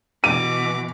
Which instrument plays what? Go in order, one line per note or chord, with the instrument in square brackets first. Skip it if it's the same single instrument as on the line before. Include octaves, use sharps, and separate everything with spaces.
[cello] B2 E3 [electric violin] D6 [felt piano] D#7